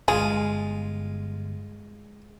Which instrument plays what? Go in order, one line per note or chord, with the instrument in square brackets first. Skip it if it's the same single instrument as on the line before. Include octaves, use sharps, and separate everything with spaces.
[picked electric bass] D1 G1 [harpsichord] G#3 F4 [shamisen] G#4